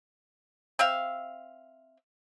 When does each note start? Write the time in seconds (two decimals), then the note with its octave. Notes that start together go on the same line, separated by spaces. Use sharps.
0.79 C4 E5 F5